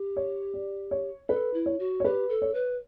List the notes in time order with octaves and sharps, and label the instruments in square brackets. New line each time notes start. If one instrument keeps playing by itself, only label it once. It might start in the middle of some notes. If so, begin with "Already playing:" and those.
Already playing: [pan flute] G4
[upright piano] C#5
D5
C#5
[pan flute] A4 [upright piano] B4
[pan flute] E4
[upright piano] C#5
[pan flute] F#4
[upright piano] C#5
[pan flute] G4 [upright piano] B4
[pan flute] A4
[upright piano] C#5
[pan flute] B4